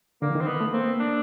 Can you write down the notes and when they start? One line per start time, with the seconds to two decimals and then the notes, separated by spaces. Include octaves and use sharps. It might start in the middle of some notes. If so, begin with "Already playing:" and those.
0.22 D3 A#3
0.30 E3
0.35 D#3
0.41 C4
0.47 B3
0.61 A3
0.73 A#3 C4
1.00 D4